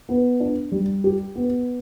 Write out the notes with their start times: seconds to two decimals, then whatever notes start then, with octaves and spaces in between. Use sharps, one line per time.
0.09 B3
0.40 D4
0.72 G3
1.04 G4
1.35 B3